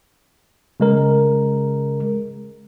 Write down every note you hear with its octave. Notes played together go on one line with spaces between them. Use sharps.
C#3 G#3 A#4